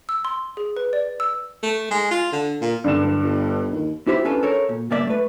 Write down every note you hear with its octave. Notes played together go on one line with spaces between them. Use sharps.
E6
C6
G#4
B4
D5
E6
A3
G#3
F4
D3
A#2
G2 D3 E7
D1
G1
D#2
E4 G4 C5 E5
C#4 D4 F4 A4 B4
A4 A#4 C#5
A#2
C#2 G2 A#3 D5 E5
A3 B4